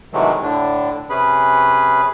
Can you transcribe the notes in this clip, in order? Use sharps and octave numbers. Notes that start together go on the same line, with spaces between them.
C3 D#3 E3 F#3 G#3 A3
A2 D3 D4
C3 C#4 G#4 B4 B5